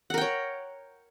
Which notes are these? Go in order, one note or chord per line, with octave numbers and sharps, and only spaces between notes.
A#4 C#5 F#5 G5